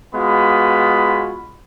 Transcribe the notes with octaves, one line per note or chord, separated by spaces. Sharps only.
G#3 B3 F4 F#4 B5